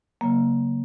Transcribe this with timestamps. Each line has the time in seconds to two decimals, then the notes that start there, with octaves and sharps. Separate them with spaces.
0.21 C#3 F#3 A#3